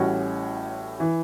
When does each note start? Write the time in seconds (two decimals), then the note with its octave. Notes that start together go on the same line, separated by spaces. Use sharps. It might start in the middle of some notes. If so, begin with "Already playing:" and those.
Already playing: A1 A2 G3 C#4 F#4
1.00 E3